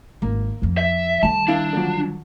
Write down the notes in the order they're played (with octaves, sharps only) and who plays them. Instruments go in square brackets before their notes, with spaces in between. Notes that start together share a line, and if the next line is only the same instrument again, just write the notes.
[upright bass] G#1 [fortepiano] A#3
[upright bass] F2 C#4
[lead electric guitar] E5
[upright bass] D#3 G3 [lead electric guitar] A5
[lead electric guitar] D4 [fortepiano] E4 F5
[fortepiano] D3 F3 F#3